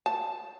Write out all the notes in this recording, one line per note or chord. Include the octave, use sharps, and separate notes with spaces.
A5